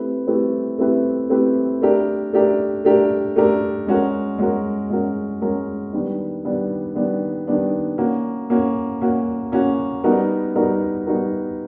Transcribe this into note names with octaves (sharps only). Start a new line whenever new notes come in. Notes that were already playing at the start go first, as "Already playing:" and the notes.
Already playing: A3 C4 E4 G4 B4
A3 C4 E4 G4 B4
A3 C4 E4 G4 B4
A3 C4 E4 G4 B4
A3 D4 G4 A#4
A3 D4 G4 A#4
A3 D4 G4 A#4
A3 D4 G4 A#4
G#3 C#4 F#4 A#4
G#3 C#4 F#4 A#4
G#3 C#4 F#4 A#4
G#3 C#4 F#4 A#4
D#3 G3 B3 D4
D#3 G3 B3 D4
D#3 G3 B3 D4
D#3 G3 B3 D4
A#3 C#4 F#4
A#3 C#4 F#4
A#3 C#4 F#4
A#3 C#4 F#4
G3 B3 D#4 F#4 A#4
G3 B3 D#4 F#4 A#4
G3 B3 D#4 F#4 A#4